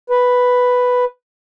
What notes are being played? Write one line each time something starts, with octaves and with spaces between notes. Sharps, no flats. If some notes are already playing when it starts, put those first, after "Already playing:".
B4